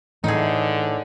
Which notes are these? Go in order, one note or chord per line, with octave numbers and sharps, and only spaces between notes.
A2 D3 E3 D#4 G#4